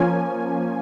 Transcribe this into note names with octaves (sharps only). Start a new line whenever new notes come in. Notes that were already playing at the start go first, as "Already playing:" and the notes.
Already playing: F3 A#3 C#4 G#5